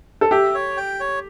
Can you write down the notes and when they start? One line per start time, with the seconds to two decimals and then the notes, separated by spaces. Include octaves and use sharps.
0.21 A4
0.31 G4 E5
0.55 C#5
0.77 G5
1.00 C#5